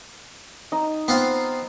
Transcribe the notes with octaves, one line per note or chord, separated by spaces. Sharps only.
D#4
B3 C4 F4